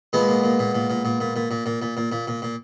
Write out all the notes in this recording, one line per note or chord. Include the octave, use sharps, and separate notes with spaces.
A#2 G#3 B3
A#2
A#2
A#2
A#2
A#2
A#2
A#2
A#2
A#2
A#2
A#2
A#2
A#2
A#2
A#2